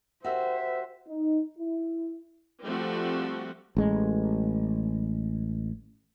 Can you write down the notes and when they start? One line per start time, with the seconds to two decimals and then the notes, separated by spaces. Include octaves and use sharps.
0.24 F#4 G4 A#4 C5 E5
1.07 D#4
1.58 E4
2.65 F3 G3 A3 C4 F#4
3.77 A1 G#3